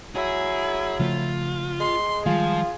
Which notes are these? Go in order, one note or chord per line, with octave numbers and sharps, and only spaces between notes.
F#3 E4 G#4
C#3 F3 A3 F4
G#3 C6
D#3 F3 G3 G#3 F4 G#4